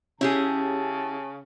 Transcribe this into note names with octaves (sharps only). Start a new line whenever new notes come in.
C#3 C#4 E4 G4 G#4 A5